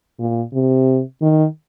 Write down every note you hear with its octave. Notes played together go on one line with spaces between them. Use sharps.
A#2
C3
D#3